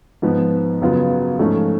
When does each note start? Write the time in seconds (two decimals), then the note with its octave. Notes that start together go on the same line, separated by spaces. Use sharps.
0.22 G#2 F3 B3
0.81 F#2 C#3 F#3 B3 F4
1.39 G#2 F3 A3 C#4